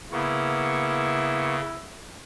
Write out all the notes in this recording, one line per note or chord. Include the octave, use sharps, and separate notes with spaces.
C#3 A#3 B3 E4 C#6